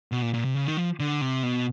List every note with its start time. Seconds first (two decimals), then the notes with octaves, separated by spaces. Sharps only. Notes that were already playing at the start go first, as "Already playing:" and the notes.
0.12 B2
0.22 A#2
0.34 A#2
0.45 C3
0.55 C#3
0.66 D#3
0.77 F3
1.00 D3
1.21 C3
1.43 B2